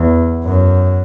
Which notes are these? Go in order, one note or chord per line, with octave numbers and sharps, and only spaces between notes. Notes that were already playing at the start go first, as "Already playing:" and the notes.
Already playing: E2
F#2